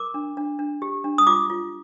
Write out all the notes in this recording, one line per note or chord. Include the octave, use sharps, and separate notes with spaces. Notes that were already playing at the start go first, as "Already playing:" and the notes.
Already playing: A#4 D6
D4
D4
D4
G4
D4
D#6
F4 D6
F4